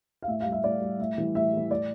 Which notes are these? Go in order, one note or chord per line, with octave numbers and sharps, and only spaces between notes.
F5
A2 E5
F5
G3
E5
A2 D5
G3
A2 E5
E3 G3
A2 E5
E3 G3
A2 D5